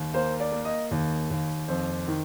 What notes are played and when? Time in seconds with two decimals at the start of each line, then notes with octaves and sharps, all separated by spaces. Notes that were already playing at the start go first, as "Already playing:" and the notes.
Already playing: D#2
0.14 A#3 C5
0.40 D5
0.52 A#3
0.65 D#5
0.91 D#2
1.30 D#2
1.68 F2 C5
2.08 D#3